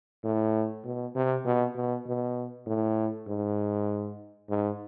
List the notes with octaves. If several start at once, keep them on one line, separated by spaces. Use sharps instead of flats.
A2
B2
C3
B2
B2
B2
A2
G#2
G#2